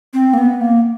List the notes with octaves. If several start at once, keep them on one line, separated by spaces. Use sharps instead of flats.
C4
A#3
B3
A#3